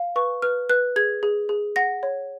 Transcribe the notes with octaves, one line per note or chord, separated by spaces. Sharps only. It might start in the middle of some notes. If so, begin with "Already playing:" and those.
Already playing: F5
B4 C#6
B4 F6
B4 F#6
G#4 G#6
G#4
G#4
F#5 A#6
C#5